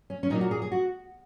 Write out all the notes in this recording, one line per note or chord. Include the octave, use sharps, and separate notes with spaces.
C#4
C#4
A#2 F#3 A#3 D#4
F#4
G#4
G#4
F#4